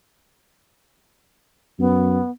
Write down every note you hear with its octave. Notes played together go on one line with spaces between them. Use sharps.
F#2 B3